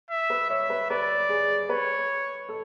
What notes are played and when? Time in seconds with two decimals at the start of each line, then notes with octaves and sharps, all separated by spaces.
0.10 E5
0.30 B4
0.50 C#5 E5
0.70 B4
0.90 B4 D5
1.29 G#4
1.69 B4 C#5
2.49 A4